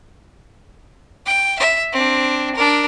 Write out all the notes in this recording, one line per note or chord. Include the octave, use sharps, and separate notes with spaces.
G5
E5
C4 D4
D4 A#4